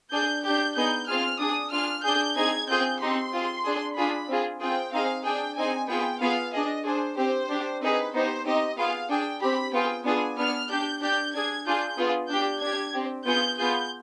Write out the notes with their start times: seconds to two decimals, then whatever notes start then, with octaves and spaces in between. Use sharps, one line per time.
0.12 D4 G#4 G6
0.44 D4 G4 G6
0.75 B3 D#4 G#4 G6
1.08 C4 F4 G#4 F6
1.40 D4 G#4 D#6
1.72 D4 F4 G#4 F6
2.04 D4 G#4 G6
2.36 C4 D#4 G#4 G#6
2.69 C4 F4 G#4 G6
3.00 C4 D#4 G4 C6
3.33 C4 F4 G#4
3.65 D4 G#4
3.96 D4 F4 G#4 B5
4.28 C4 F4 G#4
4.60 C4 F4 G#4 G5
4.92 C4 D#4 G#4 F5
5.25 D4 G#4 G5
5.57 C4 D#4 G#4 G#5
5.89 B3 F4 G#4 G5
6.20 B3 F4 G#4 F5
6.53 D4 G#4 D#5
6.85 D4 G#4 C5
7.17 C4 G4 C5
7.49 D4 G4
7.81 C4 D#4 G#4 B4
8.14 B3 D#4 G4 C5
8.45 C4 D#4 G4 D#5
8.77 B3 F4 G#4 F5
9.09 D4 G#4 G5
9.41 C4 G4 B5
9.73 B3 F4 G#4 G5
10.05 B3 D4 F4 G#4 G#5
10.38 B3 D4 G#4 F6
10.70 D4 G4 G6
11.02 D4 G4 G6
11.33 D4 G#4 G#6
11.66 D4 F4 G#4 G6
11.98 B3 F4 G#4
12.29 D4 G4 G6
12.62 D4 G4 G#6
12.94 C4 G4
13.26 B3 F4 G#4 G6
13.58 B3 F4 G#4 G6